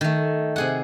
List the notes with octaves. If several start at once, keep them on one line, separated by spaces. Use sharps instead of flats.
D#3 A3
C3 G#4 F#5